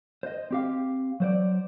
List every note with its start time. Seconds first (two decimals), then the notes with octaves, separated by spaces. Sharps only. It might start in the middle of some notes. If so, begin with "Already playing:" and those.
0.23 C5 D#5
0.51 C4 G4 F5
1.20 F#3 C5 D5